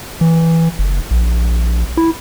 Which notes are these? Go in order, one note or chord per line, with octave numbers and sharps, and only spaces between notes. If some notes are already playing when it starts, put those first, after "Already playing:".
E3
F#1
A#1
E4